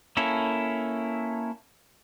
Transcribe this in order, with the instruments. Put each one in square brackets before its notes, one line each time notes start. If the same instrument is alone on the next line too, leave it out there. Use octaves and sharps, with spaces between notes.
[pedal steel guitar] A#3 C#4 E4 A4